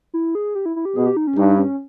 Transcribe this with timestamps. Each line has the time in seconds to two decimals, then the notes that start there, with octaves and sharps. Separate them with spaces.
0.14 E4
0.35 G#4
0.55 G4
0.66 E4
0.76 E4
0.85 G4
0.96 B2 G#4
1.06 G4
1.17 D#4
1.27 C#4
1.37 G2 D#4
1.57 C#4